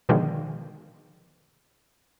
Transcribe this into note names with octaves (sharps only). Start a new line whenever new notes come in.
B2 D3 D#3 F3 G#3